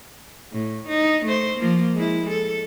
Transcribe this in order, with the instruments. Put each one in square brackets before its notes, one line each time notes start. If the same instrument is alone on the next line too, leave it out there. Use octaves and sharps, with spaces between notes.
[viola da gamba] A2
D#4
A3 C5
F3 A#3
G#3 E4
A4